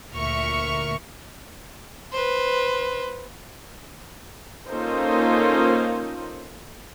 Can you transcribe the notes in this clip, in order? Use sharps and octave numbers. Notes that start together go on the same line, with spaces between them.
D2 A#2 A#4 E5 C#6 F6
B4 C5
A#3 C#4 D#4 F4 A4 C5